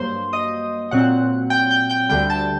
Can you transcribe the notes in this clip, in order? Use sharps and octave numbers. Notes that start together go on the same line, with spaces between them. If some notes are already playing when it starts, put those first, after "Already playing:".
Already playing: G2 F#3 A#3 C5 C6
D#5 D#6
A#2 F#3 C4 F#5 F#6
G5 G6
G5 G6
G5 G6
D2 D3 G3 G5 G6
A5 A6